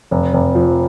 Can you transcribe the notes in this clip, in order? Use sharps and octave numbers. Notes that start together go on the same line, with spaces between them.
F1
F1
F3